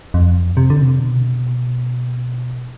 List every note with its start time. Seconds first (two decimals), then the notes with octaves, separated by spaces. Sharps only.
0.14 F2
0.57 C3
0.70 D3
0.82 C3
0.99 B2